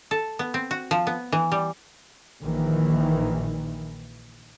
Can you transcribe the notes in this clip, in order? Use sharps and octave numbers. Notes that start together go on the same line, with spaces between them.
A4
B3
C4
F#4
F3
B3
E3
G3
A#1 A#2 D#3 E3